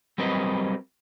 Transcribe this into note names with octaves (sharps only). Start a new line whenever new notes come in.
F#3 G3 C4 A#4 B4 D#5